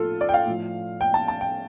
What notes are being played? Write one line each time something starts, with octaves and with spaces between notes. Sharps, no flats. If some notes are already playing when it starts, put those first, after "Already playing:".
Already playing: A2 F3 F4 A4
D5
G5
F5
A2 F3
G5
A5
A5
G5